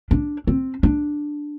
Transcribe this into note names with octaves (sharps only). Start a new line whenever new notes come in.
D4
C4
D4